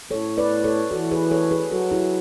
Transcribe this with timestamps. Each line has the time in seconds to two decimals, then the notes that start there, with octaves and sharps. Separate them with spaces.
0.11 A2 A4 C#5
0.38 B4 D5
0.64 A4 C#5
0.91 E3 F#4 A4
1.11 G#4 B4
1.31 A4 C#5
1.51 G#4 B4
1.72 F#3 F#4 A4
1.92 E4 G#4